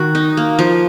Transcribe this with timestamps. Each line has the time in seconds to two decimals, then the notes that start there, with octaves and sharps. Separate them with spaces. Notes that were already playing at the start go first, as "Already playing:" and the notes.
Already playing: D#3 F#4
0.15 D#4
0.37 A#3
0.59 F3